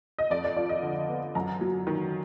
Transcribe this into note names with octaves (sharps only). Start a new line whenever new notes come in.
D#5
F2 D5
D5
F3 D5
D#5
D3
B3
F#2 A#5
F#3
D#3